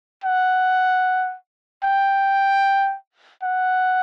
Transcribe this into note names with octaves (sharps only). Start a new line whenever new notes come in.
F#5
G5
F#5